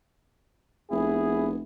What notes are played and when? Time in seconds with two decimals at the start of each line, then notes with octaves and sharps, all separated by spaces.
0.91 F1 B3 E4 G#4